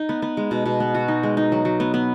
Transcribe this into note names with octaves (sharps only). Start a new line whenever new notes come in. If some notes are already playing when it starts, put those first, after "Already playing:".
Already playing: D#4
B3
B3
G#3
B2
B2
B3
F#4
D#4
G#3
D#4
F#3
F#3
B3
B3